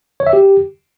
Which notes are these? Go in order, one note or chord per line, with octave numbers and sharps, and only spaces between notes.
C#5
E5
G4